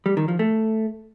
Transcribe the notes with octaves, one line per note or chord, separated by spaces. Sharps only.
G3
D#3
F3
A3